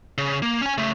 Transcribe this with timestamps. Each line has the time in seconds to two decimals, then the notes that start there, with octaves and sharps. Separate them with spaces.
0.18 C#3
0.42 A#3
0.61 C#4 G#5
0.78 C#3 A3